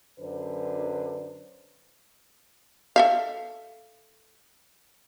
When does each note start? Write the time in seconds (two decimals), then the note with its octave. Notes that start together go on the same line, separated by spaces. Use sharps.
0.19 F#2 D3 D4 B4 C5
2.96 A4 E5 F5